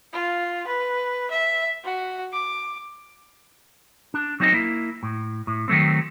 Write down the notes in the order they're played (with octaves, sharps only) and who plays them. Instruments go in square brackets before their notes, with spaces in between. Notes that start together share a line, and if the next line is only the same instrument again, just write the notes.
[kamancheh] F4
B4
E5
F#4
D6
[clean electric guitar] D4
F#3 C4 D#4 C5 D5 D#5
A#3 E4
A2
A2
D#3 F#3 A3 C4